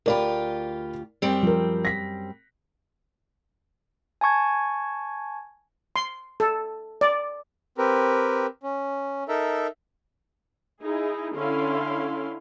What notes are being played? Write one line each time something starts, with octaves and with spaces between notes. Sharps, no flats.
D2 F4 G4 A#4 D5 B5
F#2 G3 C4
F3 A#4
A#6 B6
G#5 A5 C#6 G#6
C6
A4
D5
C4 G4 A#4 B4
C#4
D#4 A4 A#4 E5
D#4 E4 G#4
D3 C#4 E4 F5 C6